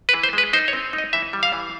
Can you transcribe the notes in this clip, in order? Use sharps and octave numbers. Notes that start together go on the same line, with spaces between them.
B4
E3
C5
G#3 B4
D#4 C5
C#5
C4
D#4
D#5
E3 E5
G3
F5
E3